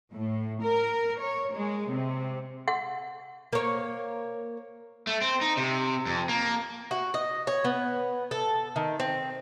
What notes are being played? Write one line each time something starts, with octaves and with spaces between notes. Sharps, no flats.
A2
A#4
C#5
G#3
C3
F#5
A#3 C#5
A3
C4
D#4
C3
F2
A#3
F#4
D#5
C#5
B3
A4
D#3
C4